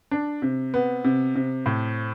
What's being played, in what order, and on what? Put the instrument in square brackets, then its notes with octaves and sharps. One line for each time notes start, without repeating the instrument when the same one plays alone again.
[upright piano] D4
C3
B3
C3
C3
A2